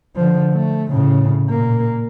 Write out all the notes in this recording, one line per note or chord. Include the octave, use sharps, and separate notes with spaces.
D3 F3
A3
A2 C#3
A#2 A#3